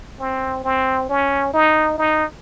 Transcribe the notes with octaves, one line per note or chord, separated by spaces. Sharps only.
C4
C4
C#4
D#4
D#4